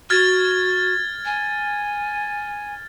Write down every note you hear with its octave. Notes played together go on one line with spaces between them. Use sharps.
F#4 F6 G#6 A6
G#5